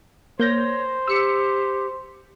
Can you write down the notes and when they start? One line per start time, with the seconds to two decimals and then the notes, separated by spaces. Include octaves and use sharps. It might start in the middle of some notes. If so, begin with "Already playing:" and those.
0.39 A#3 C5 C#5 G6 A#6
1.07 G4 E6 C#7